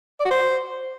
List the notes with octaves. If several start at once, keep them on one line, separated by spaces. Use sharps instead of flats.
D5
F#4
C5